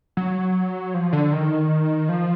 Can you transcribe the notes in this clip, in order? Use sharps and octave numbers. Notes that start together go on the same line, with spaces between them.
F#3
F3
D3
D#3
F3